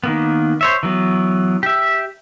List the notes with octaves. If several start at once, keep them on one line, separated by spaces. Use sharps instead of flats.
D#3 A#3 B3
C5 C#5 E5
E3 F#3 B3
G4 E5